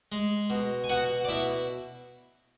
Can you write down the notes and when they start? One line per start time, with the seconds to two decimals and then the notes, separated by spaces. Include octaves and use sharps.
0.12 G#3
0.50 B2
0.84 G#5
0.89 B2 F#4 F#5
1.24 D5
1.29 B2 E4 E5